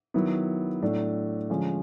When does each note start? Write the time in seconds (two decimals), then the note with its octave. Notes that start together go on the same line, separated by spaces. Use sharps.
0.14 D#3 F#3 B3 E4
0.82 A2 F#3 A3 D4
1.50 D3 F3 G#3 C#4